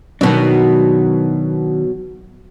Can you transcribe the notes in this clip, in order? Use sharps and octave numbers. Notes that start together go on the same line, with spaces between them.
B2 D#3 F#3 B3 D4